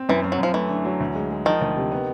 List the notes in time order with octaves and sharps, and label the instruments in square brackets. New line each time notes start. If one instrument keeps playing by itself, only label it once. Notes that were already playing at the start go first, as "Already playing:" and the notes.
Already playing: [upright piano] C4
[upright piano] F#2 [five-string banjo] E3
[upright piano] F#2
[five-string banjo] F#3
[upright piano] F#2 [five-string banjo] F3
[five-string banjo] E3 [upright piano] A3
[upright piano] D3
F#3
D2
G#3
G#3
[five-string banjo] D#3 [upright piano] F3
[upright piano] D2
C3
B3